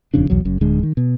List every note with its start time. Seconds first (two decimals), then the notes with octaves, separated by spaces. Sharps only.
0.14 D#1 F2 C#3 D4
0.30 B1 E2 F#3
0.45 F#1 F#2
0.61 D1 D3 G#3
0.83 D#3
0.97 B2